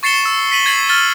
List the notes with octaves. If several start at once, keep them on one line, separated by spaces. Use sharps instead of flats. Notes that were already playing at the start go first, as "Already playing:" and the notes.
C#6 A6 C7 C#7 E7 G7
E6
B6 D#7 F#7 G7
G#6 A6 C7 F#7
F6 A6 G7